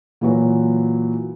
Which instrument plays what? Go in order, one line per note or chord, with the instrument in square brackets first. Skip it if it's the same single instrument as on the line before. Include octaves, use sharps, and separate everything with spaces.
[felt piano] A#2 E3 F#3 A#3